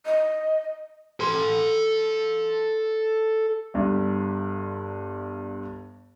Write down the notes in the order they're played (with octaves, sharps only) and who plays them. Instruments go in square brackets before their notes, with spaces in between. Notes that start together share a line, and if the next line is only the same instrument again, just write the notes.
[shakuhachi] D#5
[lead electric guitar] A4 C6
[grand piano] G1 G2